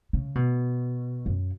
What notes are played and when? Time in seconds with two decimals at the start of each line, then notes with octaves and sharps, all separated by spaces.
0.13 C#3
0.35 B2
1.26 F#2